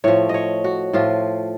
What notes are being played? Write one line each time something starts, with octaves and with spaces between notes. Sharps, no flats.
A2 F3 C#5
C#5 D#5
F#4
A2 F3 F4